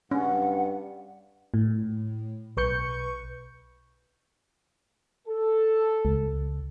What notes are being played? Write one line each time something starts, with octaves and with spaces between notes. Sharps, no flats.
G2 C#4 F#5
A2
B1 B4 C#6 G6 C#7
A4
C#2